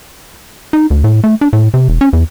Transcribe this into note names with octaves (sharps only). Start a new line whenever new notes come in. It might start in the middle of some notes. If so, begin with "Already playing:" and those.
D#4
D2
A2
A3
D4
A2
C3
E1
C#4
E2